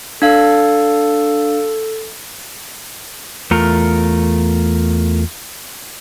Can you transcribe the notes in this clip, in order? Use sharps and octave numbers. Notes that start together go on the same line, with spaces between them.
D4 A4 F5
E2 A3 F4 A#4